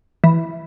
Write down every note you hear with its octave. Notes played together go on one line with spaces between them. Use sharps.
E3